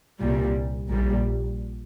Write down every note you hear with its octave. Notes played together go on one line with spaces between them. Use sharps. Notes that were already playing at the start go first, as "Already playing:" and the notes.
C2 A#2 G3
A#1 A#2 G3